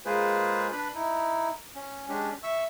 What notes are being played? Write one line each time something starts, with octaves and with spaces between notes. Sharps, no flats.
G#3 A#3 F4 G#4 B4 C5
D4 B4 B5
D#4 E4
C#4
G#3 C#4 D4 G4
E5 C#6 E6